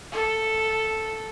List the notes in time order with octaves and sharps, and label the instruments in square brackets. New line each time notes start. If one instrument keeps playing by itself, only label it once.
[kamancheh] A4